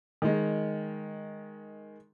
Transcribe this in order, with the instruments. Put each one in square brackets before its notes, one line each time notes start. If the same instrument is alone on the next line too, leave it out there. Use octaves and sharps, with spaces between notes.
[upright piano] D#3 G#3